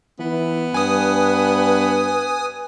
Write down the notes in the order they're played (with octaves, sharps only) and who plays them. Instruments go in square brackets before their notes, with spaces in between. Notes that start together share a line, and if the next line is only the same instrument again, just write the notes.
[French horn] E3 [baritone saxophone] B3
[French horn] G2 [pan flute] B4 [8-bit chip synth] G#5 D#6